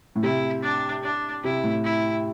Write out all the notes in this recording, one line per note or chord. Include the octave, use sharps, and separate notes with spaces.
A2
C3 E4
D4
D4
C3 E4
A2
E4